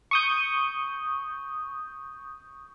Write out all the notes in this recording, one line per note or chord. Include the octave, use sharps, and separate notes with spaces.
C#6 D#6 G6